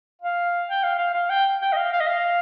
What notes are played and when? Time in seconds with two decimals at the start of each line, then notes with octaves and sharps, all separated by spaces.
0.22 F5
0.69 G5
0.84 F5
0.99 F5
1.14 F5
1.30 G5
1.62 G5
1.72 D#5
1.76 F5
1.93 F5
2.00 D#5
2.07 F5